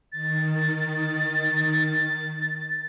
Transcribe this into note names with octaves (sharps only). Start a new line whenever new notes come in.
D#3 A6